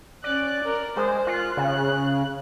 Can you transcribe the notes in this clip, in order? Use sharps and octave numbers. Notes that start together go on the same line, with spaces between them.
C#4 D5 F#6
A#4
G#3 C5
F4 F#6
C#3